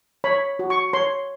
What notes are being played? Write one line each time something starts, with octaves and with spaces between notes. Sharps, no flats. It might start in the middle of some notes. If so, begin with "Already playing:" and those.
C#5 B5
F#4
C#6
C#5 C6